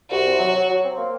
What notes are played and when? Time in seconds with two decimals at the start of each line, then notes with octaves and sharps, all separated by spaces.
0.10 C2 F#4
0.25 C3
0.40 F#3
0.54 F#3
0.69 F#3
0.84 C4
0.97 A#3